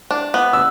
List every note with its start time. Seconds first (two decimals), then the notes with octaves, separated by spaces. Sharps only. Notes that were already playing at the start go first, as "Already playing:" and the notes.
0.11 D4
0.34 B3
0.53 E6